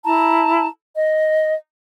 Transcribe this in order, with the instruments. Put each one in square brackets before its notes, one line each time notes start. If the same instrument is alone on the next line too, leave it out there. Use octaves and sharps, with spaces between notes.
[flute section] E4 A5 A#5
D#5